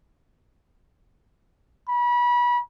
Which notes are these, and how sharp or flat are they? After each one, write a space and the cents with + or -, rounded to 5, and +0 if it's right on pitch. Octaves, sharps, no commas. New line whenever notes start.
B5 -30